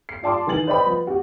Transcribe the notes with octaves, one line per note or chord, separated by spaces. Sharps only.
C7
F4 D5 A5 C6 D6
D#3 E3 G#5 A6 F#7
B4 C5 D5 D#5 G5 B5
F3 B3
F#4 G4